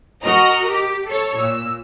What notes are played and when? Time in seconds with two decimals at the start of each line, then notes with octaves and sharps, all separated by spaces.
0.23 F#4 A#4 D#5 A#5 F6
0.67 G4
1.08 A4 C#5
1.36 A#2 E6